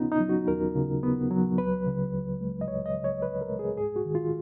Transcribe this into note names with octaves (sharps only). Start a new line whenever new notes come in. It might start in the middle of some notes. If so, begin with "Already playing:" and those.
Already playing: D#2 C#3 B3 C#4 D#4 F4
D#4
F#3
F#4
D#2 A#4
C#3
B3
F#3
C#2 B4
C#3
C#2
G#3
D#5
C#2 C#5
D#5
C#3
C#5
C#2 B4
A#4
G#3
G#4
G#2 G#4
F#4
D#3
F4